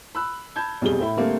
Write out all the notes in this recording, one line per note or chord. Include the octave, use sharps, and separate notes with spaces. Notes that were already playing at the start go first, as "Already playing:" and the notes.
B5 E6 F#6
A5 B5 G6 G#6
B1 F2 G3 G#4 G7
A2 E4 B5
D3 G3 A3 A#3 C4